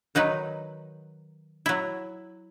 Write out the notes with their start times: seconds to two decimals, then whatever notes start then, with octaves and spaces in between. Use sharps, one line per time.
0.15 D#3 F#3 D#4 B4
1.66 F#3 E4